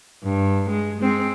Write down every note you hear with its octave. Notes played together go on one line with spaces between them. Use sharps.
G2
G#3
G#3 C4